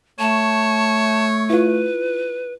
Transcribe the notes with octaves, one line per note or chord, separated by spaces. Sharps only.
A3 C#5 A5
E4 F4 B4